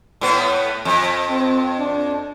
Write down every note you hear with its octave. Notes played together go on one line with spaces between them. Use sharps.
A2 B3
F2
C4
D4